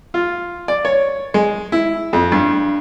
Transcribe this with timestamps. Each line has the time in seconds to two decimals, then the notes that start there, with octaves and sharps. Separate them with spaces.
0.14 F4
0.68 D5
0.85 C#5
1.34 G#3
1.72 E4
2.13 F2
2.32 G2